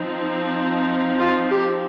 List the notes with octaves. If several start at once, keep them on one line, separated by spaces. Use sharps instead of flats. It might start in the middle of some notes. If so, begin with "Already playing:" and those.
Already playing: F3 C4 D#4
F4
G4